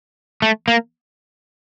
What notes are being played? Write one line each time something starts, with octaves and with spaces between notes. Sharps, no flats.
A3
A#3